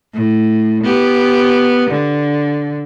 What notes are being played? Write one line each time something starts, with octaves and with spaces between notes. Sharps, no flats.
A2
B3 G4
D3